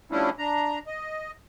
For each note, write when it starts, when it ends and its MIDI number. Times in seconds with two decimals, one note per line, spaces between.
0.12 0.30 53
0.12 0.30 55
0.12 0.30 57
0.12 0.30 61
0.12 0.30 62
0.12 0.30 64
0.39 0.79 62
0.39 0.79 82
0.87 1.31 75